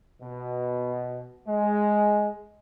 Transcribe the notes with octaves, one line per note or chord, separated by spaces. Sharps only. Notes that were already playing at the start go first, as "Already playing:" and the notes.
B2
G#3